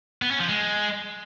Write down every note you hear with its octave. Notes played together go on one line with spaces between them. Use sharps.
B3
C#4
F3
G#3